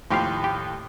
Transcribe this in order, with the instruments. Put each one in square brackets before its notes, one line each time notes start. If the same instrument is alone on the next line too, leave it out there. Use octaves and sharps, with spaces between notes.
[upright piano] D#2 A2 [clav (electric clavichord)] F3 G4 F5
[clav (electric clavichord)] G4